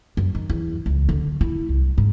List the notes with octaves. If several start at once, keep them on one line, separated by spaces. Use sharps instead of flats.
F#2
D#3
E2
C#2
D3
E4
C2
G#2